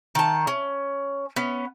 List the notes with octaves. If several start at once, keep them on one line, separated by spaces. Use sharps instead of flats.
D#3 A5
C#4
B3 C#4